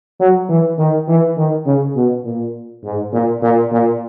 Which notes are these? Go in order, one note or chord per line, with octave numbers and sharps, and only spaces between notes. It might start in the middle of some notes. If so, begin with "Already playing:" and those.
F#3
E3
D#3
E3
D#3
C#3
B2
A#2
G#2
A#2
A#2
A#2